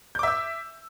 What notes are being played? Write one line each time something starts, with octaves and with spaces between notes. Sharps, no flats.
E5 D6 E6 G6